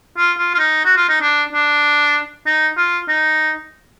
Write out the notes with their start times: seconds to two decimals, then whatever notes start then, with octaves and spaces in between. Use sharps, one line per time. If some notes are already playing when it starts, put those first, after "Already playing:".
0.17 F4
0.38 F4
0.54 F4
0.59 D#4
0.85 F#4
0.97 F4
1.09 D#4
1.21 D4
1.53 D4
2.46 D#4
2.77 F4
3.08 D#4